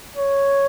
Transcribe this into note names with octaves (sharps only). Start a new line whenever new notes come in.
C#5